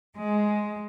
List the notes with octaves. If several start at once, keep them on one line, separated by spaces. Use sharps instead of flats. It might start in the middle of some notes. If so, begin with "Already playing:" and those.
G#3